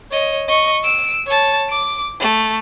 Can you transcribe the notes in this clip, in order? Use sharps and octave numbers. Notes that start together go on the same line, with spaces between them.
C#5 D#5
D#5 C#6
E6 D7
C#5 A5
D6 D7
A3